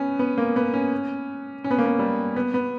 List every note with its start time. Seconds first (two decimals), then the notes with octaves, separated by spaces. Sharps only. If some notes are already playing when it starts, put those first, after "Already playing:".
Already playing: B3 C#4
0.19 B3
0.38 A#3
0.56 B3
0.73 C#4
1.64 C#4
1.71 B3
1.78 A#3
1.86 B3
1.99 G3
2.36 B3
2.54 B3